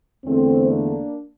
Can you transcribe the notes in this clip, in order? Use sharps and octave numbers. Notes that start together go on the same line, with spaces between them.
E2 D3 A3 C4
A#3 D4